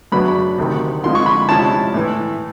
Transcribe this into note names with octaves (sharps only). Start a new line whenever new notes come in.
F#2 C#3 F#3 B3 D4 B5
D2 C3 D#3
F2 D3 F3 G#3 C6
C#6
B5
C3 F3 G#3 C#4 E4 A5
A2 E3 A3